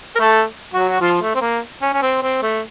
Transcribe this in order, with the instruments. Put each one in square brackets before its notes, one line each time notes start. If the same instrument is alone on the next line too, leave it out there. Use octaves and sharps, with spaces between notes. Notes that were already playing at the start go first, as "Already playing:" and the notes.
[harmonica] A#4
A3 A4
F#3 F#4
F#4
F3 F4
A3
C4
A#3
C#4
C#4
C4
C4
A3